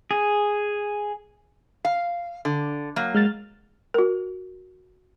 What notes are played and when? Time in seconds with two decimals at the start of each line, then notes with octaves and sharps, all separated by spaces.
0.11 G#4
1.85 F5
2.45 D3
2.96 F#3 A#3
3.15 G#3 F6 A6
3.94 F#4 A#4